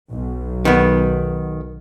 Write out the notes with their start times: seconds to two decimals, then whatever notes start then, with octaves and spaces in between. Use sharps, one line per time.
0.12 B1
0.65 D#3 B3